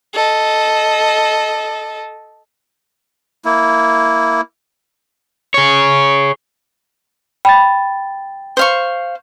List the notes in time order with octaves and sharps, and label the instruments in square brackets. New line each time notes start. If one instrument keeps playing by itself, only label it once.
[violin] A4 D#5
[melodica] A#3 E4
[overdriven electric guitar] G#4 C#5
[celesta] G5 A6 [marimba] B5
[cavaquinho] C5 F5 C#6